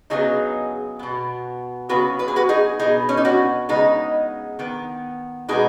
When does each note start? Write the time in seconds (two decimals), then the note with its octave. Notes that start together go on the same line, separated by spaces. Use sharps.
0.10 C#3 F#3 B3 D#4 G#4
0.99 B2 B3
1.89 C#3 F#3 B3 F#4 B4
2.19 B4
2.28 G#4
2.36 F#4 B4
2.49 D#4 G#4
2.79 B2 B3 D#4 G#4
3.09 C#4
3.17 D#4
3.25 C#4 F#4
3.69 C#3 G#3 B3 D#4
4.59 D#3 B3
5.48 B2 G#3 B3 D#4 G#4